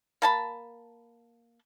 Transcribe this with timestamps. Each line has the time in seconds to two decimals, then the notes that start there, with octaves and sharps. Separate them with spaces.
0.22 A#3 A5 B5